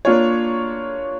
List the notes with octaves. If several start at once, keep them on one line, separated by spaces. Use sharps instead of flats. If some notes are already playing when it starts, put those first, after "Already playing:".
A#3 D4 F4 C#5